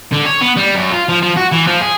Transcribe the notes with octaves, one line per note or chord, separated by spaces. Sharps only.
D3
C#5
B3
G3
F#2
F4
F3
F3
F#4
E3
F3
G#4